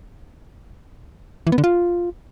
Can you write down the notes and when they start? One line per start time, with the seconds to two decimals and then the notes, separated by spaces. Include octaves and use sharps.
1.47 E3
1.52 B3
1.58 D3
1.64 F4